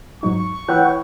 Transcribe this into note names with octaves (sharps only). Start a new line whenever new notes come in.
G#2 F#3 D#4 C#6
E3 C#5 F#5 G5